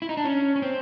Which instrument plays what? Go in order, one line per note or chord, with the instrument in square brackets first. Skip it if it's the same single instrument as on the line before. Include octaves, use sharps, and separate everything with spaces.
[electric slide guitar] E4
D#4
D4
C#4
C#4
C4